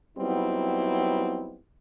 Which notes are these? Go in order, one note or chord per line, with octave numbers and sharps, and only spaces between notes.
F#3 G3 B3 C4 D#4 E4